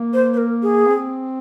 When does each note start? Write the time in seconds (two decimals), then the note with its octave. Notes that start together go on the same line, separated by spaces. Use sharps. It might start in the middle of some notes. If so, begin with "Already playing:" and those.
Already playing: A#3
0.13 C5
0.33 C5
0.37 A#4
0.63 G#4
0.88 C4